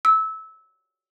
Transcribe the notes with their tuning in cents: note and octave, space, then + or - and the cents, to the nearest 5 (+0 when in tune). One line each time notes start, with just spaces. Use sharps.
E6 -20